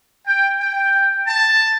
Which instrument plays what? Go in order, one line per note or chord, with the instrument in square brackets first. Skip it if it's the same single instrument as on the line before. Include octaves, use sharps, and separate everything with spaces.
[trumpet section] G5
G5
A5